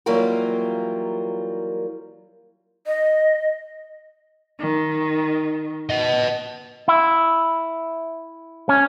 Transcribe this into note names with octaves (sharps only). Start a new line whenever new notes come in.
E3 F#3 G3 A#3 F4 A#4
D#5
D#3
B4 D#5
E4
C#4